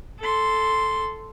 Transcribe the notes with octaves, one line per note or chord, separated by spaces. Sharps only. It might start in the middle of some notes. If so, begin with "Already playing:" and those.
A4 C6